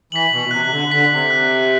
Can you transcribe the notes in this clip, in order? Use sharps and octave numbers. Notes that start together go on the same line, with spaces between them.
E3 B6 F#7
B2
C3 F#6
C3
D3
D3 B6 F#7
C3
F#6